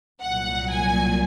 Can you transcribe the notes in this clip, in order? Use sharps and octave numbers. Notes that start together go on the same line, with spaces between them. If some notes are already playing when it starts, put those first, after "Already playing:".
C2 A#2 F#3 F#5
G#5